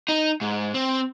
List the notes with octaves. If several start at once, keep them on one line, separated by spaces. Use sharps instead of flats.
D#4
G#2
C4